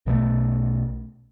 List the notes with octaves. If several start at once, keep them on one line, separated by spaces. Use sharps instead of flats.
B1 B2 D3 A3